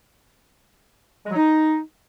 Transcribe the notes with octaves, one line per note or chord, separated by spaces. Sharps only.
G#3
F#3
D#4